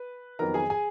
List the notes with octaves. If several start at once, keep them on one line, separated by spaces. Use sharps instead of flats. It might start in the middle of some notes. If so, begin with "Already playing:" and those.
Already playing: B4
F2 D#3 F#3 B3 D#4 A#4 A#5
G#4 G#5
G#4 G#5